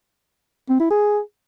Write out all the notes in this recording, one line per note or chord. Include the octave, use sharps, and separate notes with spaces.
C4
E4
G#4